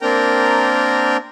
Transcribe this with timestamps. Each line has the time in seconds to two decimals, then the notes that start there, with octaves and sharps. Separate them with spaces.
0.01 A#3 C4 D4 A#4 G5 A#5